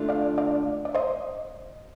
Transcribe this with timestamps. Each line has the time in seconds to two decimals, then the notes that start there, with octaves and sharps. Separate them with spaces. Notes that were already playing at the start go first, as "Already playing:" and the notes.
Already playing: D3 A3 D4 F4
0.09 D5 F5
0.38 D5 F5
0.85 D5
0.95 C5 D#5